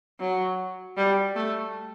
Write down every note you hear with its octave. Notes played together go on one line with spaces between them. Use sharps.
F#3
G3
A3